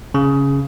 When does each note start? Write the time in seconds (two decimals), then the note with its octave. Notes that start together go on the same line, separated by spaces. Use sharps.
0.14 C#3